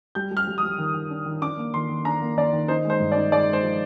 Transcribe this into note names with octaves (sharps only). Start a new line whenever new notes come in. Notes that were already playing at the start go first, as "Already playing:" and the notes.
G3 G6
G3
F6
G3
D#6
G3
D#3
D#3
D4
D#3
D4 D6
A#3
D#3 C6
D#3
D4 A#5
A#3
D#3 D5
D#3
D#4 C5
G#3
C5
G2
D5
D#4
G#3 D5
G#3 C5
F3